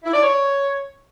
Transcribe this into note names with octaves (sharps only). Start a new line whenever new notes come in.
E4
D5
C#5